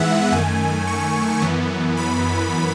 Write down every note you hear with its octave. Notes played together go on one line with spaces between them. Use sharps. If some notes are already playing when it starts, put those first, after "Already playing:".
Already playing: G#2 E3 G#3 B3 E5 F#5
F#2 D#3 A3 G#5
C#6
F#2 E3 B3
B5